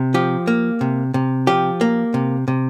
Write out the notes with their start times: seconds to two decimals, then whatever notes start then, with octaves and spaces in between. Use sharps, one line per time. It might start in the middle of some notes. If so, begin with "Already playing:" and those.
Already playing: C3
0.14 F3 G4
0.47 A#3
0.81 C3
1.14 C3
1.47 F3 G4
1.81 A#3
2.14 C3
2.48 C3